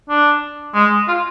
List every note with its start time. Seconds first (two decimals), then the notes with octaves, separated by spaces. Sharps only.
0.09 D4
0.74 G#3
1.08 F4